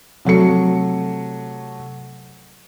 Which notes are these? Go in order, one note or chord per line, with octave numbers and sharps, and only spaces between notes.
C3 F#3 A3 C#7